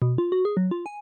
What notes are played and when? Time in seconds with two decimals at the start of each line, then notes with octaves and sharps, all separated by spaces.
0.02 B2
0.18 F4
0.32 F#4
0.45 G#4
0.57 F#3
0.71 F4
0.86 G#5